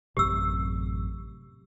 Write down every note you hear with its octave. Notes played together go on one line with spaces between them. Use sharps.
A1 F#2 C3 G4 E6